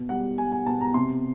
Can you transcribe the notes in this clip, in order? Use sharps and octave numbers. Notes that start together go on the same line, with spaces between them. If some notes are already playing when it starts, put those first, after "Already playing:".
Already playing: B2
G3 F#5
G3 G#5
G#5
B2 A5
A#5
C3 C6